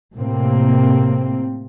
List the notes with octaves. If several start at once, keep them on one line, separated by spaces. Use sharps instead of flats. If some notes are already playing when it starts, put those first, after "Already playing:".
A2 C3 A#3 C4